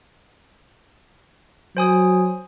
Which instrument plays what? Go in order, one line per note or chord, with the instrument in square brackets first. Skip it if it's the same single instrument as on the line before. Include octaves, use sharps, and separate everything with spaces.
[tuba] F#3 [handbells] C5 G#5 D#6